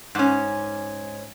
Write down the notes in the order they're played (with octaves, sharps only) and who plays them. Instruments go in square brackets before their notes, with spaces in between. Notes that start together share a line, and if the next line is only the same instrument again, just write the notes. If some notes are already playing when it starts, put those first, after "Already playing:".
[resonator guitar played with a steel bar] G#2 C#4